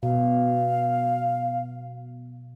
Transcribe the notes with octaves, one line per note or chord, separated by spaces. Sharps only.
B2 F5